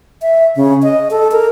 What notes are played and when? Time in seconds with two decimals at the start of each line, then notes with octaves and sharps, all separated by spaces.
0.22 E5
0.56 C#3
0.83 D#5
1.11 A4
1.31 A#4